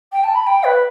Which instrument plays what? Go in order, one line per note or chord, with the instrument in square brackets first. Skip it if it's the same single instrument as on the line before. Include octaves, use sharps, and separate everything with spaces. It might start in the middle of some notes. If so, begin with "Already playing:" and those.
[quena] G5
A5
B5
G5
B4